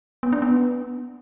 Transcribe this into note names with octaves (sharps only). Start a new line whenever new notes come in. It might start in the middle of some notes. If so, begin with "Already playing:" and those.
B3
D4
B3